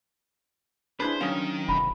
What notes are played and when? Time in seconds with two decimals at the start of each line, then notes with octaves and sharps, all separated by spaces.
1.00 D4 E4 G#4 B4 C5
1.21 D#3 F#3 C#4 F5 D#6
1.69 E1 B5